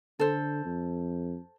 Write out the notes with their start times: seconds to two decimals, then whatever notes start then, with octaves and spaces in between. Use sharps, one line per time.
0.19 D3 A4 C5
0.65 F2